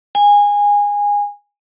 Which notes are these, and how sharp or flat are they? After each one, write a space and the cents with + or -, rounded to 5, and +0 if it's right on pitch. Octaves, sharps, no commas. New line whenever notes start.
G#5 -20